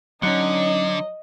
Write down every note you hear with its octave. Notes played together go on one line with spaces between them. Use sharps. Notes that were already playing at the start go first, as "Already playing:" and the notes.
D3 F#3 C#4 D#4 D#5 F#5